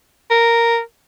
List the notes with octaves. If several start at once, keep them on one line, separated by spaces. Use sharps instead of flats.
A#4